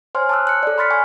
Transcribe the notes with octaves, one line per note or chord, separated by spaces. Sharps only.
C5 C#5 G#5 C6 F6
A5 C6 D6 E6 F#6
C#5 F#6 C#7
A4 D5
B5 C6 F6 A6 B6 C#7
G#5 C#6 F#6